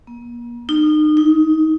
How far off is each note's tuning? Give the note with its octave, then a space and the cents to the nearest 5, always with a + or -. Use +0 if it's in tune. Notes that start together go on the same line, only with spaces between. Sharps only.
A#3 +40
D#4 -30
D#4 +20